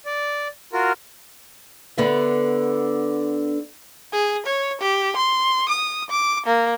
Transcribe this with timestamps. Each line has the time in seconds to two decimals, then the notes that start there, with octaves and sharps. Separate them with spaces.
0.06 D5
0.73 F4 F#4 A#4
1.98 D3 B3 E5
4.13 G#4
4.46 C#5
4.81 G4
5.17 C6
5.69 D#6
6.10 D6
6.46 A#3